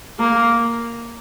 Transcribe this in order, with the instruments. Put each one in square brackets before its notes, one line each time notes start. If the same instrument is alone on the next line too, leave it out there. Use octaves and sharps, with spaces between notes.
[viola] A#3